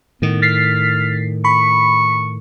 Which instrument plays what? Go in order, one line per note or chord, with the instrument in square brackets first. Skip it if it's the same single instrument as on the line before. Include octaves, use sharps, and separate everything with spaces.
[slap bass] A2 D#3 [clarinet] B3
[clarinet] F6 [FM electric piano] A6 B6 C7
[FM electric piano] B5 [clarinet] C#6